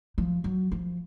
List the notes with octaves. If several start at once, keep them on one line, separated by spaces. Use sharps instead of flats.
F3
F#3
F3